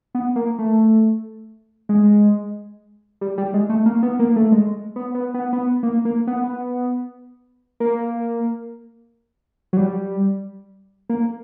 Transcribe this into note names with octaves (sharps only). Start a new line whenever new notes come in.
B3
A#3
A3
G#3
G3
G3
G#3
A3
A#3
B3
A#3
A3
G#3
B3
B3
B3
B3
A#3
A#3
B3
B3
A#3
F#3
G3
A#3